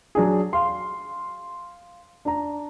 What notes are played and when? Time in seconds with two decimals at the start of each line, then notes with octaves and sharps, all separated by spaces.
0.15 F#3 D4 G#4
0.53 F5 C6
2.25 D4 A#5